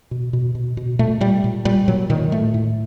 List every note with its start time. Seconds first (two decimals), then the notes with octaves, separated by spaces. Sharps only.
0.11 B2
0.33 B2
0.55 B2
0.77 B2
0.99 A#2 A3
1.21 A#2 G3
1.44 A#2
1.65 A#2 G3
1.88 A#2 F#3
2.10 A#2 D#3
2.32 A2 A3
2.54 A2